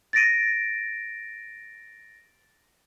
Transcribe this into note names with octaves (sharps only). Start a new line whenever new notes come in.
A6 A#6 D7 D#7